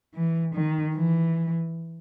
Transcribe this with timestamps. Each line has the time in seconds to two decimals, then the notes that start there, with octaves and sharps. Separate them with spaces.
0.15 E3
0.55 D#3
0.95 E3